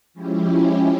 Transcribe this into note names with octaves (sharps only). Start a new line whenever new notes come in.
F3 G#3 C#4 E4 G4